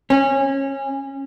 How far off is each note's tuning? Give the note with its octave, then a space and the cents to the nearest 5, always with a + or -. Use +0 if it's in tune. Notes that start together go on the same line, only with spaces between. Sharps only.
C#4 -20